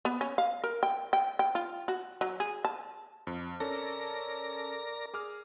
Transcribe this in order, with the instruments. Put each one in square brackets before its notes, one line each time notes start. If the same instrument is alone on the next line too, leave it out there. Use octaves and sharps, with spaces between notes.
[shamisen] B3
C#4
F5
A#4
G5
G5
G5
F4
F#4
F#3
G#4
A5
[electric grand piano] F2
[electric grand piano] C#4 A4 [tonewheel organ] A#4 D5 A#6
[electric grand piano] G#4 D6 F6